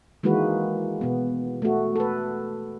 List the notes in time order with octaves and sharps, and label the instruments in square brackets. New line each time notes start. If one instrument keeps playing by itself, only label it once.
[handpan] D#3 E3 G#3 A#3 F#4 B4
B2 B3
A3 F#4
A4 B4